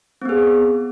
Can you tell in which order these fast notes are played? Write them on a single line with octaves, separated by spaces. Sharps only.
C4 B3 G#4